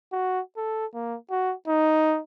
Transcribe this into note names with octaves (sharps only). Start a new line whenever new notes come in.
F#4
A4
A#3
F#4
D#4